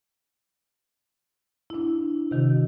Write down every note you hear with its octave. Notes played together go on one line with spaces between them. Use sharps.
D4 E4
C3 D#3 F#4